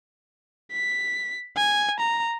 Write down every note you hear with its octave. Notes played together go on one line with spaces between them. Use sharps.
B6
G#5
A#5